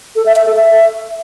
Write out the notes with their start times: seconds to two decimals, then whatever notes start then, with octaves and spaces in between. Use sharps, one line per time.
0.16 A4
0.26 E5
0.36 E5
0.46 A4
0.56 E5